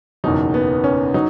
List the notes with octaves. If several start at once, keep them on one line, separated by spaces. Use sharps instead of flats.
F#1 E2 B2 F#3 D#4
B3
C#4
F#3 D#4